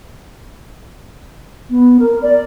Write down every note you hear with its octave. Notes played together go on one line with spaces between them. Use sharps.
B3
A#4
D5